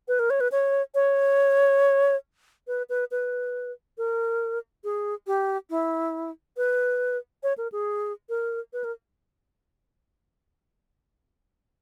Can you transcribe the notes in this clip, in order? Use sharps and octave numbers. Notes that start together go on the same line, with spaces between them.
B4
A#4
C#5
B4
C#5
C#5
B4
B4
B4
A#4
G#4
G4
E4
B4
C#5
A#4
G#4
A#4
B4
A#4